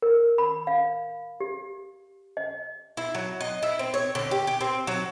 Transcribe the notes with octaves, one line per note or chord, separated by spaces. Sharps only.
A#4
B5
F5
G4
D#5
E4
F#3
D#5
E4
C4
C#5
D3
G4
G4
C4
F#3